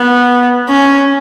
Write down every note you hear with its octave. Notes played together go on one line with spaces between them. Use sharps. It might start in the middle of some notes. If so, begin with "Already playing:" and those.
Already playing: B3
C#4